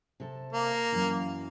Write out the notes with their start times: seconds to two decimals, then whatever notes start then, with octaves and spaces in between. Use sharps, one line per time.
0.20 C3 A4 A5
0.53 A#3
0.92 F#2 E3